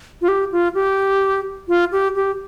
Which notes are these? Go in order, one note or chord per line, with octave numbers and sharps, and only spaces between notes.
F4
G4
F4
G4
F4
G4
G4